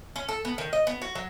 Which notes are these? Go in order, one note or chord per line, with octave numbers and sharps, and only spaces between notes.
C#4
A4
B3
D#3
D#5
B3
F#4
F#3